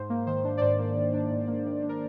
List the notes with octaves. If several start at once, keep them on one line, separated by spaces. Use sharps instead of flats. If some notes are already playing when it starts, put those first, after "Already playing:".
Already playing: G#2 C5
A#3
D#3 C5
D4
D5
G#2 C5
A#3
D#3
D4
G#2
A#3
D#3
D4
A#4